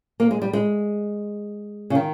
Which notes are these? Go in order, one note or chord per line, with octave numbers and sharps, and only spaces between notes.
A#3
G#3
G3
G#3
C#3
D#3